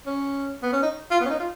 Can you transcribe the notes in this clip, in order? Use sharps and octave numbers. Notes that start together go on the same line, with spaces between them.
C#4
B3
C#4
D#4
F4
B3
C#4
D#4
F4